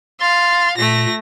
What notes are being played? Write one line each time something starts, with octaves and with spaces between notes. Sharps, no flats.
F5 C6 A6
A#2 A3 A#6